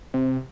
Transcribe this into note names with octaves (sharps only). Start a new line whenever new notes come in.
C3